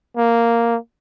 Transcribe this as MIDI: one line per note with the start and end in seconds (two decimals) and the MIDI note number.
0.17 0.77 58